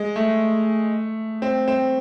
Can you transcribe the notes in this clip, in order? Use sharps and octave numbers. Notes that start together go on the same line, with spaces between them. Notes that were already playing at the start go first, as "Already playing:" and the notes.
Already playing: G#3
A3
C4
C4